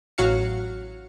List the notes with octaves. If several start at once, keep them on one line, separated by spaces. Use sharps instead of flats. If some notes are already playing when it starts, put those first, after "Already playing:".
A1 F#3 F#4 F5 C#7